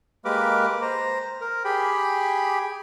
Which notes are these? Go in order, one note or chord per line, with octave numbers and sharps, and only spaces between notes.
G#3 A#3 G4 A#4 B4 D6
C5 A#5
A#4
G4 G#4 G5 B5